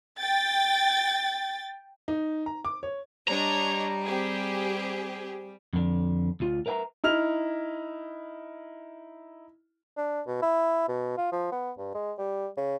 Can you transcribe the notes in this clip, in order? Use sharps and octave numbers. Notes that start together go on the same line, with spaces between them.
G5 A6
D#4
A#5
D6
C#5
G3 D4 C#5 D#5 A#5
C4 G4 G#4
F2 D3
D2 F4
A#4 B4 E5 G#5 A#5
D#4 E4 F6 F7
D4
B2
E4
B2
F4
F3
B3
G2
G#3
G3
C#3